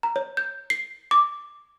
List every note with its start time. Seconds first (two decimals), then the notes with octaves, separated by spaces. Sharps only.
0.03 A#5
0.16 C#5
0.37 G6
0.70 C7
1.11 D6